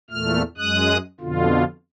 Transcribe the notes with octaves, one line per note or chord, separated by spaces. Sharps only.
E2 A#2 A3 F6
F#2 G#3 D#6 F#6
F2 B2 D3 F4